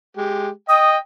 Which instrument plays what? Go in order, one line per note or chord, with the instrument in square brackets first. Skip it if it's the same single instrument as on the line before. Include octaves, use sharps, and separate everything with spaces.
[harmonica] G#3 G4
[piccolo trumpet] D#5 [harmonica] G5 [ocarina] D#6